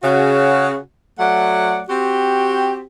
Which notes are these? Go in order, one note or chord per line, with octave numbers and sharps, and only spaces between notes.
C#3 F#4
F#3 A3 D5 F#5
C4 F#4 G4